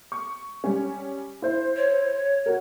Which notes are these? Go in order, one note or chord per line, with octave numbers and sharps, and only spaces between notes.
C#6
G3 C#4
E4 C5
C#5
F#4 A#4